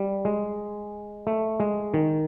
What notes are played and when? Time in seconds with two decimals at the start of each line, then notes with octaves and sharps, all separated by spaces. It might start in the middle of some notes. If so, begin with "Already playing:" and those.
Already playing: G3
0.25 G#3
1.27 A3
1.60 G#3
1.94 D#3